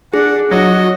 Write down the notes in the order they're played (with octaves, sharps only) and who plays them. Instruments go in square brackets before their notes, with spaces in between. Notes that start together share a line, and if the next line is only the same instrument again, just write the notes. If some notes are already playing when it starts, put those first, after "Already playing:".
[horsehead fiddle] D4 [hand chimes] G#4 [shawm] F#5
[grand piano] F#3 [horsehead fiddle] F#4 [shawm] D#5